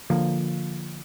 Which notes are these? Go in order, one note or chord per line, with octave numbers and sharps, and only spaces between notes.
D3 F3 A#3